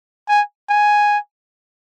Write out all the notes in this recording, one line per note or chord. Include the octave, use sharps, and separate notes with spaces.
G#5
G#5